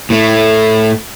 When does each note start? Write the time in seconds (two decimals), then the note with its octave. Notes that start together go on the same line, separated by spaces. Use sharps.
0.10 A2 A3